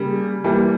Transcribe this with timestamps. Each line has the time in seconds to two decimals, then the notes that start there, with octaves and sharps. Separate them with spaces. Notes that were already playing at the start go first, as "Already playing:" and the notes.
Already playing: C#3 G3 A#3
0.44 E3 G3 A#3